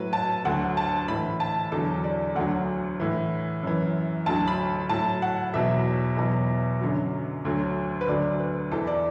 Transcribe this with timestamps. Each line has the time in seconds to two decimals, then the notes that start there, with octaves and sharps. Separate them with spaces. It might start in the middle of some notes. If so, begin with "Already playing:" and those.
Already playing: A2 F#3 B4
0.13 A5
0.45 D2 D3 F#3 F#5
0.77 A5
1.08 A2 E3 B5
1.40 A5
1.72 E2 D3 F#3 A4
2.04 D5
2.35 D2 D3 F#3 F#5
3.00 A2 E3
3.63 F#2 E3
4.26 D2 D3 F#3 A5
4.48 B5
4.89 A2 F#3 A5
5.22 F#5
5.54 E2 B2 F#3 E5
6.17 E2 B2 F#3
6.81 F#2 D3 F#3
7.45 D2 D3 F#3
8.01 B4
8.08 D2 D3 F#3 D5
8.39 B4
8.72 E2 E3 A4
8.87 D5